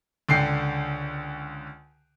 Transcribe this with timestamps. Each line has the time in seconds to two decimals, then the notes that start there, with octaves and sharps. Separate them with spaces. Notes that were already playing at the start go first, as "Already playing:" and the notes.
0.29 C#2 D3 G5 C7